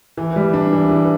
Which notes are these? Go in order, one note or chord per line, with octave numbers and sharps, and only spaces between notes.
E3
G3
D4
E3
E3